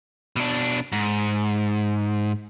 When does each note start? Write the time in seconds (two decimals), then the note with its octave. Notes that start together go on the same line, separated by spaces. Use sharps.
0.36 B2 D4
0.92 G#2